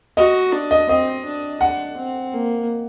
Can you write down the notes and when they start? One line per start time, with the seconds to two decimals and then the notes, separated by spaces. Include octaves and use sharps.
0.17 F#4 D#5
0.53 D4
0.71 D#5
0.89 C4 D#5
1.25 D4
1.61 D4 F#5
1.97 C4
2.32 A#3